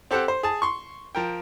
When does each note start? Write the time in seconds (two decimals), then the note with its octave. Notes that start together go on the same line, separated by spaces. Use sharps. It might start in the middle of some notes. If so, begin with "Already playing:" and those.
0.11 C4 G4 A4 C5 F#5
0.28 C5
0.43 G#4 A5
0.62 C6 C#6
1.15 F3 A#4 G5